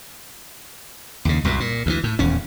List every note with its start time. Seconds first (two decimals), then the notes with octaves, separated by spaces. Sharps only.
1.25 D#2 C#3
1.45 C2 F#2 A#2
1.60 A#2
1.86 D2 C#3 E3
2.04 A2
2.19 D#1 E2 C#4